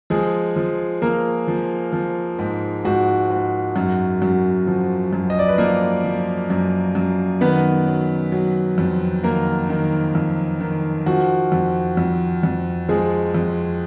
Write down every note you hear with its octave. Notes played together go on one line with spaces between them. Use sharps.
F3 G#3 G#4
F3
F3 A#3 A#4
F3
F3
G#2
G#2 F#4
G#2
F#2
F#2
F3
F#2
D#5
D5
B4
F3 A#3 A#4
F3
F#2
F#2
D#3 B3 B4
F#3
F#3
F2
D#3 A#3 A#4
D#3
F2
D#3
F3 F#4
F2
F2
F2
F3 G#3 G#4
F2